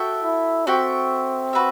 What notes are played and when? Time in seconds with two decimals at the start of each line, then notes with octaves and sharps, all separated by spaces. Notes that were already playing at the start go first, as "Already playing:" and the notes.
Already playing: F#4 A4 E5 G5
0.24 E4
0.67 C4 F#4 A4 E5 G5
1.53 F#4 B4 E5